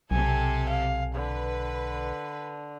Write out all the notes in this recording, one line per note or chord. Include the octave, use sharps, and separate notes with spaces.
B1 C3 G4 A4 G#5
F5
D3 B4